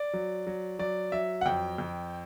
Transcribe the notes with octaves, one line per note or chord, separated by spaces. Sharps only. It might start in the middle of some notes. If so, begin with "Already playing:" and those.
Already playing: D5
F#3
F#3
F#3 D5
F#3 E5
F#5
F2 G5
F2